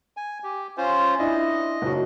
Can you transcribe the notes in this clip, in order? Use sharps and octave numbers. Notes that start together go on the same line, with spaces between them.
G#5
G4
C#4 F4 C5
D4 E4 D#5
F#1 F#3 F#4